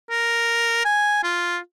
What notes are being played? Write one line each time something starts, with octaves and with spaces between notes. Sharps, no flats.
A#4
G#5
F4